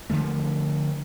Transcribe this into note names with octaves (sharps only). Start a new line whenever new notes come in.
D3 D#3 F3 A3